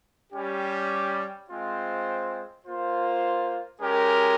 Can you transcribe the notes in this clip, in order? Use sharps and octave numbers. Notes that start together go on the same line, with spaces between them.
G3 C#4 G4
G#3 C4 F4 C5
A#3 F4 C5
G#3 C#4 G4 A#4